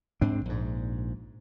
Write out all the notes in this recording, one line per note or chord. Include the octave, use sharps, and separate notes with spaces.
G#2 C4 D4
A#1 G#2